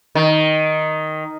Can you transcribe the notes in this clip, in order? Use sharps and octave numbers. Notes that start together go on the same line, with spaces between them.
D#3